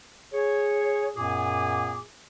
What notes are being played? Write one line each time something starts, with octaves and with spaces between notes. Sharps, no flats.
G#4 C#5
F#2 A#2 B3 G#4 G#5 D6